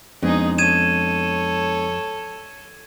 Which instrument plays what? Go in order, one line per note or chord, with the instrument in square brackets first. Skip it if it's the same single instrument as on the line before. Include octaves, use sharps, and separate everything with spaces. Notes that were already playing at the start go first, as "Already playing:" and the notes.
[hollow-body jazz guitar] F2 [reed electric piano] G#3 B3 D4 [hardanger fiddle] D#4 G#4
[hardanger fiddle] A4 C#5 [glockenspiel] G#6 D#7 E7